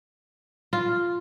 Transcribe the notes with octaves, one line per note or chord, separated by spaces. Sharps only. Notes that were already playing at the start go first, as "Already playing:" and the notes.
F4